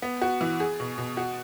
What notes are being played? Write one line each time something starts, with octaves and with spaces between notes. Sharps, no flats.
B3
F#4
E3
G#4
B2
B2
F#4